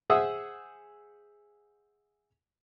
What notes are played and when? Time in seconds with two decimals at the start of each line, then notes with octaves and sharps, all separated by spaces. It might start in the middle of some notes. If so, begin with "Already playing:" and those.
0.10 G#4 C5 E5 F#5 D#6 E6